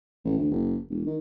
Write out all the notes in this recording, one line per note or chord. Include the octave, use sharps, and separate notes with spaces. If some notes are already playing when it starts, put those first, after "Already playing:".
A1
D2
F#1
E1
D#3